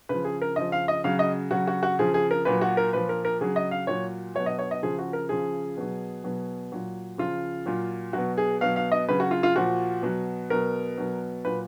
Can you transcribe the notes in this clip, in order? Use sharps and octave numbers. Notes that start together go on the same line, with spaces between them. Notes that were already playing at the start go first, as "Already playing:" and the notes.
C#3 F3 B4
G#4
A#4
C#3 F3 D#5
F5
D#5
C#3 F#3 F5
D#5
C#3 F#3 F#4
F#4
F#4
C#3 F3 G#4
G#4
A#4
A#2 F#3 B4
F#4
A#4
A#2 F3 B4
A#4
A#4
C#3 F#3 G#4
D#5
F5
A#2 F#3 C#5
B2 F#3 C#5
D#5
C#5
D#5
C#3 F3 G#4
F#4
A#4
C#3 F3 G#4
B2 F#3
B2 F#3
A#2 F#3
C#3 F3 F4
A#2 F#3
B2 F#3 F#4
G#4
B2 F#3 F5
F5
D#5
C#3 F#3 B4
F#4
F4
F4
A#2 F3 F#4
B2 F#3
B2 F#3 A#4
B2 F#3
A#2 F#3 B4